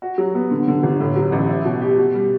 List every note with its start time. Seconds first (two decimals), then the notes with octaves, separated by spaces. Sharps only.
0.02 F#4
0.18 F#3
0.35 B3
0.51 D3
0.68 D3
0.83 G1
1.00 A2
1.16 F#3
1.32 A1
1.49 E4
1.65 B2
1.81 G4
1.98 B2
2.14 G3